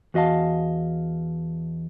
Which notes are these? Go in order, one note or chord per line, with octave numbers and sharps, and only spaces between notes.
E2 F#4 D#5 F5 A5